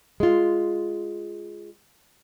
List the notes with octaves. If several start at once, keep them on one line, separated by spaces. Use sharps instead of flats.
G#3 F4